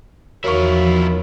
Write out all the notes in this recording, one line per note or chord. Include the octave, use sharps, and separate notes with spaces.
E2 D#3 F3 F#3 E4 F4 A#4 C#6